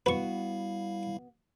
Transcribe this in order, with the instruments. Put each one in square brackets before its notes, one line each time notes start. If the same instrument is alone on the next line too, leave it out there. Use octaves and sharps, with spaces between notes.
[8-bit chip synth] G3 E4 F5 [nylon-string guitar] B3 F#4 [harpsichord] B4 C#6